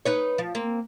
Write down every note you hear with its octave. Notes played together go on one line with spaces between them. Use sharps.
D#4 B4 C#5
F3
A#3 C4